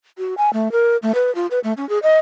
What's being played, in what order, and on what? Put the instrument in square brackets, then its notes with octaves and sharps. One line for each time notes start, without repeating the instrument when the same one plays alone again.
[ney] F#4
G#5
A3
A#4
A3
B4
F4
B4
A3
C#4
G#4
D#5